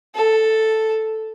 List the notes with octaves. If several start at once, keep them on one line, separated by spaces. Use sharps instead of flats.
A4